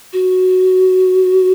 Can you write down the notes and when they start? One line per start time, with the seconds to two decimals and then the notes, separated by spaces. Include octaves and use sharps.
0.13 F#4